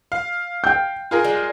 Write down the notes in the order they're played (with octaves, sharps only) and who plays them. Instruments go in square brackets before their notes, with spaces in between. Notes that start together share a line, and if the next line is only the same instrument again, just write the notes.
[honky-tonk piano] F5
[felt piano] G5 G6
[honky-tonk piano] F4 G#4 A#4
[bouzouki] G3 G#3